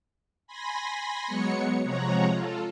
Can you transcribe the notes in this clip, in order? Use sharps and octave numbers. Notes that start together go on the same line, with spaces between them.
G#5 B5 C6 A#6
F#3 G#3 B3 C#5 C#7
C3 F3 G#3 C#5 F#5 A#5
F4 A4